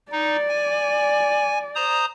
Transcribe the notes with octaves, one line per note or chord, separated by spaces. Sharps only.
D#4 D5
G#5
C5 A#5 D#6